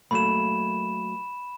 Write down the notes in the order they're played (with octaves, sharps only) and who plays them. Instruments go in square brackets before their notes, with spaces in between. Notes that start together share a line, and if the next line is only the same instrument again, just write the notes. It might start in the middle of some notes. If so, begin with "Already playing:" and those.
[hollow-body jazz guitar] F#3 A3 A#3 [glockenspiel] B5 E7